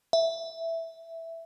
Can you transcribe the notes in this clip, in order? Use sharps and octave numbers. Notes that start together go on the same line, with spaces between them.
E5